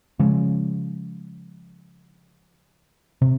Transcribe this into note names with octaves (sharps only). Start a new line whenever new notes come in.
C#3 F3 G#3
C3